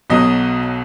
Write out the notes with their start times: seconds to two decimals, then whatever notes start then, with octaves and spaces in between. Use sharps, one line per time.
0.10 B1 B2 F#3 D#5